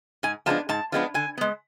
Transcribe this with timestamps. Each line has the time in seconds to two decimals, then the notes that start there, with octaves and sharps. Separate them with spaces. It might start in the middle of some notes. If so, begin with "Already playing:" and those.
0.23 G#2 G#5
0.46 F3 G#3 B3 D4 A5
0.69 G#2 A5
0.92 F3 G#3 B3 D4
1.14 D3 G#5
1.38 G#3 B3